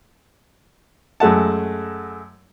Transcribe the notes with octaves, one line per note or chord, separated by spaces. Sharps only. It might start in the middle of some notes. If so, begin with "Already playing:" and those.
F#2 G#3 A3 F#5 A5